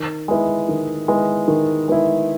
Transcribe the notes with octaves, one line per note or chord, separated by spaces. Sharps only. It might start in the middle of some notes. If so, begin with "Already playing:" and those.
Already playing: D#3
G#3 B3 E4
D#3
G#3 B3 E4
D#3
G#3 B3 E4